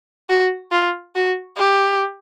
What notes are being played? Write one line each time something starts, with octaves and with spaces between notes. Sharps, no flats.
F#4
F4
F#4
G4